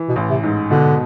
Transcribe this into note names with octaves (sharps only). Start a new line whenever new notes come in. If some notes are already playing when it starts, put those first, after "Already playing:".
Already playing: E3
B2
A1
C3
G#2
B2 D3